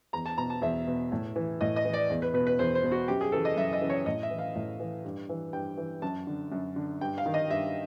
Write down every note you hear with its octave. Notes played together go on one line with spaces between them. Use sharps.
E2 A#5
A5
B2 A#5
A5
E2 E5
B2
A2
E3
A2 D#5
D#5
E3
D5
E2
B4
B2 B4
B4
E2 C5
C5
B2
F#4
F#2 G4
G#4
C#3 E3 A4
D#5
F#2 E5
D#5
C#3 E3
C#5
A2 D#5
E5
E3
F5
A2
E3
G2
E3
G2 G5
E3
F#2 A5
D3
F#2
D3
G2 G5
F5
D#3
D#5
G2 E5